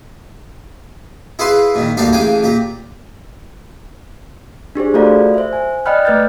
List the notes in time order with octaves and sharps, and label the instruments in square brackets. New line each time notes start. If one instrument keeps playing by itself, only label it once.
[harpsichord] E4 G#4 B4 F5 C6
A#2 D#3
D2 G3 A#3 D4 G4 F5
A1 C#3 F5 G5 G#5
A#2 G4
[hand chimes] D4 G4 G#4 C5
A3 F4 F#4 A4 D5 F5
C5 E5
G#5
D5 D#5 G5 B5 F6 F#6
A3 B4 F6 G6 A6